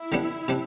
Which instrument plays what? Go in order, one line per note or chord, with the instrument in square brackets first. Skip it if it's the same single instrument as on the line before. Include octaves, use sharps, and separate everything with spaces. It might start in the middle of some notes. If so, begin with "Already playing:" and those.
Already playing: [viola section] E4
[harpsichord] D3 G3 B3 D4
C3 G3 D4